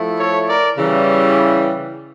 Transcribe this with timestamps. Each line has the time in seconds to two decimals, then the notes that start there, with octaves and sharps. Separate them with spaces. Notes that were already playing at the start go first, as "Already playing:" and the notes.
Already playing: F3 A3 E4
0.19 A4 C#5
0.48 A#4 D5
0.78 C#3 E3 G3